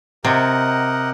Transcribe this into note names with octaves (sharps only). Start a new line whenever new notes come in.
C3 G4 A#4 D#5 F#5